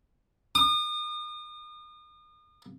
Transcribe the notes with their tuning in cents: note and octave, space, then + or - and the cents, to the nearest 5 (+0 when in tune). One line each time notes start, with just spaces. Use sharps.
D#6 -35